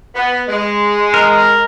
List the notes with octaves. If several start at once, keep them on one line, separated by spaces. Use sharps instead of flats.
B3
G#3
A#4